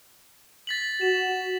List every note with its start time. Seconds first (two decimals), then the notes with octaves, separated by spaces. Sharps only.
0.67 A6 B6 F#7
1.01 F#4 E7